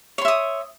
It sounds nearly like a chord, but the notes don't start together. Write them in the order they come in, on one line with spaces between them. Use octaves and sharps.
C#5 C6 E5 D#6